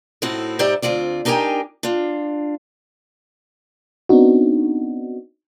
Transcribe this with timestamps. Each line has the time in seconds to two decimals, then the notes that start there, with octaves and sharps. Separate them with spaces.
0.22 A2 C4 D#4 E4 F#4
0.59 G#2 D#4 G4 C5 D5 E5
0.82 D2 C#3 C4 F4 D5
1.25 D4 D#4 G4 A#4 G5 G#5
1.83 D4 F4
4.09 B3 C4 D4 D#4 F#4